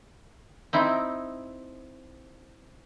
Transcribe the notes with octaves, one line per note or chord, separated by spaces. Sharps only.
C4 D#4 E4